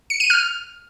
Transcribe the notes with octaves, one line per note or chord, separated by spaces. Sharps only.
C#7
D#7
F6